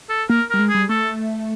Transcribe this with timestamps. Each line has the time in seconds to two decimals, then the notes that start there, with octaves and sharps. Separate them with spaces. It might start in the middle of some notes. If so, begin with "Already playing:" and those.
0.09 A4
0.29 A#3 A#4
0.50 G3 A#4
0.59 G#3
0.69 G3 G#4
0.89 A3 A4